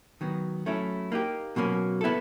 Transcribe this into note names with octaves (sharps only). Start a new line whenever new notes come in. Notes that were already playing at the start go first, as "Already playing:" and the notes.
D#3 F#3 B3
F#3 A3 C#4 E4
A#3 D#4 G4
B2 F#3 A#3 C#4
B3 E4 A4